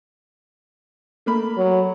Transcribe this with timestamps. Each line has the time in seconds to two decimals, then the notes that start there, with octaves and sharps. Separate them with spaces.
1.26 A3 A#3 B5
1.57 F#3